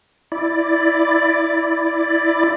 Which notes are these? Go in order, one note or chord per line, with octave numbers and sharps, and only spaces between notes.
E4 D5